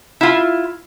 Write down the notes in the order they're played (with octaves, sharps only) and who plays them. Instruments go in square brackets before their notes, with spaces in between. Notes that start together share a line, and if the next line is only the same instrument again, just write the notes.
[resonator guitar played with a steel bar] E4 F4